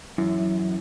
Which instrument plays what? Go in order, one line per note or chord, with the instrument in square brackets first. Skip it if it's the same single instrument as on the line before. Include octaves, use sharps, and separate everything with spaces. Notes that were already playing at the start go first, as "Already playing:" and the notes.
[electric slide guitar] F#2 [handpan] E3 E4